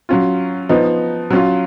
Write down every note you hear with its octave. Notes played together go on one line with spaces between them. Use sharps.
F#3 C#4 F4
F3 B3 D#4
F#3 C#4 F4